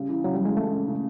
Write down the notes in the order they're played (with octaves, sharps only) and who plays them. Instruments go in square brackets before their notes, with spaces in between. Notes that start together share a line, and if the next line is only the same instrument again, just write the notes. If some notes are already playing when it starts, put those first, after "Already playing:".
Already playing: [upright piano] C#3 G3
E3
[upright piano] C#3 [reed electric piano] F#3
[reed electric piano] G3
[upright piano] E3 [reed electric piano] G#3
[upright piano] G#3 [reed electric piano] A3
[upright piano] C#3
C#3